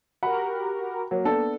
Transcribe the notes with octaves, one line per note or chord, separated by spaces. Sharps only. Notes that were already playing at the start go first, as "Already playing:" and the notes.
F#4 G4 A#4 F#5 B5
F#3 A#3
B3 D4 A4